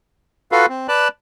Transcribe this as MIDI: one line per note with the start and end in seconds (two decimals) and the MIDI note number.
0.52 0.66 65
0.52 0.66 66
0.52 0.66 69
0.52 0.66 71
0.52 0.66 77
0.69 0.87 60
0.88 1.08 71
0.88 1.08 74
0.88 1.08 81
0.88 1.08 90